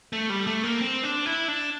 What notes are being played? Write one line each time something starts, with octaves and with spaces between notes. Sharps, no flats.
A3
G3
A3
A#3
C4
D4
E4
D4